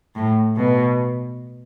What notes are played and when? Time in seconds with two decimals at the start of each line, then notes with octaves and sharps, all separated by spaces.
0.16 A2
0.57 B2